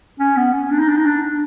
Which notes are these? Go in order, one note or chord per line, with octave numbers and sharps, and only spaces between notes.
C#4
B3
C#4
D4
D#4
D4
D#4
D4